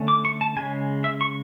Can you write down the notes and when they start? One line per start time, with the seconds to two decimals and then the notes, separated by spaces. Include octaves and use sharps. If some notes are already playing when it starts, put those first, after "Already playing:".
Already playing: D3 A3 C#4
0.08 D6
0.25 C#6
0.41 A5
0.57 C#3 G#3 C#4 G#5
1.04 E5
1.21 C#6